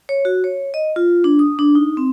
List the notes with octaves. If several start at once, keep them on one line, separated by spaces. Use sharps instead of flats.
C#5
F#4
C#5
D#5
F4
D4
D#6
D4
D#4
C4